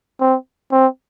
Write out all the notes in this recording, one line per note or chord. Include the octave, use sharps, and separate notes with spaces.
C4
C4